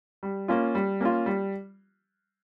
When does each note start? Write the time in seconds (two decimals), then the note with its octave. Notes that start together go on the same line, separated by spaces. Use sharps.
0.23 G3
0.48 A#3 C#4 F4
0.75 G3
1.01 A#3 C#4 F4
1.26 G3